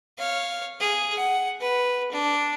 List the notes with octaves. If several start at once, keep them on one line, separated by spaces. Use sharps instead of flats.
C#5 F5
G#4
F#5
B4
D4